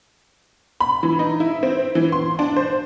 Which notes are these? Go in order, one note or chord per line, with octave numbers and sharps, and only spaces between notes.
B5
E3
D#4
E4
C4
E3
C6
D4
C5